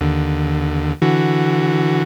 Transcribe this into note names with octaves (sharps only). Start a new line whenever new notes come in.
D#2 D3
D3 E3 F#4